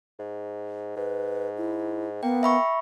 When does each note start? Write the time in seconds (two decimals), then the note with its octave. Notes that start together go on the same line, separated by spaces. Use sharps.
0.19 G#2
0.96 G#2 B4
1.58 E4
2.23 A#3 B3 G5
2.43 E5 B5 C#6